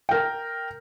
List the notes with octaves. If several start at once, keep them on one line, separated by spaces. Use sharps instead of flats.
A#4 G5